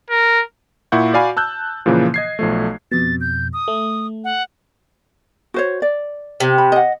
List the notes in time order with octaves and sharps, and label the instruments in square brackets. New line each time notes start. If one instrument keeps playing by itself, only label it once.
[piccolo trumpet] A#4
[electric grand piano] A#2 E4 F#5 C#6 G6
F#4 D5 F5 G#5 B5
A5 E6 F#6 G6
A#2 C#3 E3 F3 A#3
D#5 G#6 C7
B1 F3 A3
[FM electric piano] F2 B2 [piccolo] A6
[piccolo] G6
D#6
[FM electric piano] A3
[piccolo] F#5
[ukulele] F#4 C5 C#5
D5
[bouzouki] C3
[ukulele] B5
D#5 F#5